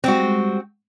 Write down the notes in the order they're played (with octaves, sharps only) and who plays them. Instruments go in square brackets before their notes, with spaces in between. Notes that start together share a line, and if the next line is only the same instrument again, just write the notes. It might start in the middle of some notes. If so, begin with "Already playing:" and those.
[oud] G3 G#3 [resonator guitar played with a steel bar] C4 F#4